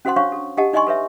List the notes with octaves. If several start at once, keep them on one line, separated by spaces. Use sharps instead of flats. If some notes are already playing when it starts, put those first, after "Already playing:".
C#4 F#4 A4 C5 F#5 C6
D4 C5 C#5 F5 C#6
A4
D4 G4 A4 D#5 F#5 A5
D#4 D5 D#5 G#5 C6 C#6
A4 B4 C#5 E5